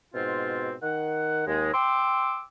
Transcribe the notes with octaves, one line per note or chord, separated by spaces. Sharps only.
G#2 B2 C4 F4
D#3 F#5
D#2 G#3
G5 C6 D6 E6